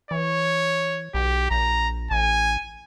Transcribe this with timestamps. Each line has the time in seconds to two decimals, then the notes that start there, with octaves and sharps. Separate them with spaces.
0.11 E3 C#5
1.14 B1 G4
1.51 A#1 A#5
2.11 A1 G#5